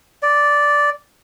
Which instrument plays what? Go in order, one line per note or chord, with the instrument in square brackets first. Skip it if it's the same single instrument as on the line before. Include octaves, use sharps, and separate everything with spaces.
[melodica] D5